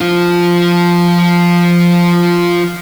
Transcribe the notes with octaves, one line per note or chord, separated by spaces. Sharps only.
F3 F4